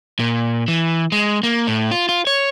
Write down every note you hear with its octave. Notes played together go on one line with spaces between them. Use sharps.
A#2
E3
G#3
A#3
A2
F4
F4
C#5